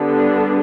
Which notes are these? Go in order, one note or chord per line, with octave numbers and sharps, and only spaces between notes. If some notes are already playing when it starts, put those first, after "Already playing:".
Already playing: D3 G3 B3 D4